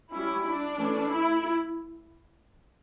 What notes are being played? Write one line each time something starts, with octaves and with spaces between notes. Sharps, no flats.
G3 C#4 E4
D4
E3 A3 C#4
E4